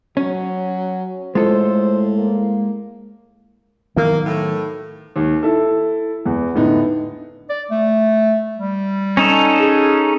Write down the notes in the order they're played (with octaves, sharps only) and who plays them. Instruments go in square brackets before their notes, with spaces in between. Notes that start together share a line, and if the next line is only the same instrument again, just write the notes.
[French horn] F#3 [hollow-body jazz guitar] C#4
[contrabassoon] A2 [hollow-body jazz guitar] G#3 F4 A4 [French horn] C5
[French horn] A#3
[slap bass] D#3 F#3 B3 [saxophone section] A#3
[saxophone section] A2
[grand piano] D#2
E4 A4
E2
A2 D3 B3 D#4
[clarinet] D5
A3
G3
[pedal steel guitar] C#4 D#4 A4
[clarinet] G#4